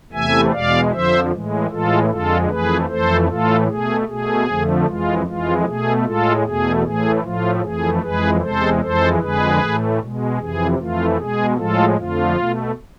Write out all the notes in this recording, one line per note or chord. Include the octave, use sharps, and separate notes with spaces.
E2 C3 E3 A3 E5 G#5
E2 B2 G#3 D5 F5
F2 D3 F3 C5 E5
A2 E3 G#3
A2 E3 G#3 F4 A4
F2 D3 G#3 F4 A4
F2 E3 A3 G#4 B4
F2 E3 A3 A4 C5
A2 E3 A3 F4 A4
B2 A3 G#4
B2 A3 G#4
F2 D3 F3 A3
F2 E3 G#3 F4
F2 E3 G#3 F4
B2 A3 G#4
A2 G#3 F4 A4
E2 B2 A3 G#4
A2 E3 A3 G#4
A2 F3 A3 F4
F2 E3 A3 G#4
F2 E3 G#3 G#4 B4
E2 C3 G#3 A4 C5
F2 E3 G#3 A4 C5
F2 D3 G#3 G#4 B4
A2 E3 A3
B2 G#3
F2 C3 E3 G#4
F2 E3 A3 F4
B2 G#3 G#4
A2 F3 G#3 F4 A4
F2 D3 F3 A3 F4
B2 A3